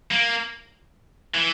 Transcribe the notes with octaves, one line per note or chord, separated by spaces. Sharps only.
A#3
E3